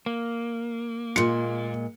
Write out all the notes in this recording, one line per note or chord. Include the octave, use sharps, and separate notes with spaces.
A#3
A#2 G#3 F4 C#7